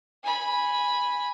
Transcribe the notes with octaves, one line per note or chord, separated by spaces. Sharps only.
G#5 B5